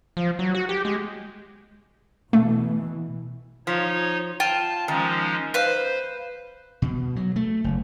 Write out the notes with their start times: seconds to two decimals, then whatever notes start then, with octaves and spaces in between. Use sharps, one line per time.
0.17 F3
0.39 F#3
0.55 F#4
0.69 G4
0.85 G#3
2.33 B2 E3 A3
3.67 F3 D#4 C#5
4.40 F4 G5 A5
4.88 D#3 F3 G#3 C#4
5.54 B4 C5 F5
6.82 B2
7.16 F#3
7.36 A3
7.64 F#1